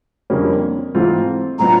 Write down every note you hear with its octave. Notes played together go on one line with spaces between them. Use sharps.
F2 D3 G3 A#3 C#4
G#2 E3 A3 C4 F4
A2 F#3 B3 D4 F4 A#5